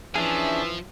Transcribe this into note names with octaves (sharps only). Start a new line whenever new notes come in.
E3 F3 C#4 D4 G#4 E5